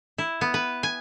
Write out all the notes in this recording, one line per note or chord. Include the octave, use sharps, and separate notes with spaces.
E4
B3
B4
G#5